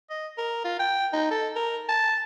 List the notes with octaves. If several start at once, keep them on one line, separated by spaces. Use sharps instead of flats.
D#5
A#4
F4
G5
D#4
A4
A#4
A5